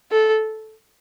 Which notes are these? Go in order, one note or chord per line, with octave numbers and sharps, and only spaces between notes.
A4